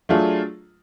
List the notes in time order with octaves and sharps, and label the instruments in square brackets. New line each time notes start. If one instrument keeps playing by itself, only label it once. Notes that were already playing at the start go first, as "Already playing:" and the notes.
[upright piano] F#3 A3 D4 F4 G#4